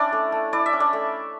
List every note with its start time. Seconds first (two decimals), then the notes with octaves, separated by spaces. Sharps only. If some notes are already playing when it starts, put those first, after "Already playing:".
Already playing: C#4 D4 E4 D5
0.13 A3
0.32 A3
0.53 E4 D5
0.66 E5
0.73 C#4
0.80 D4 D5
0.93 A3